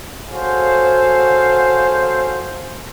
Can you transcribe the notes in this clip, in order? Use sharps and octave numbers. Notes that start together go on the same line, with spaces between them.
F#4 G#4 A4 C5 C#5 F5